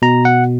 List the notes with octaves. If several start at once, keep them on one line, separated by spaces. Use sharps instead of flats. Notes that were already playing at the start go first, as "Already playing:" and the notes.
B2 A#5
F#5